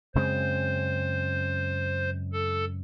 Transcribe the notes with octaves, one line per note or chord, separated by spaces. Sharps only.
F#2 C#3 G#3 C4 C5
A4